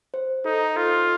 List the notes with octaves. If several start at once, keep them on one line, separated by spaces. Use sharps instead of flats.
C5
D#4 A4
F4 A4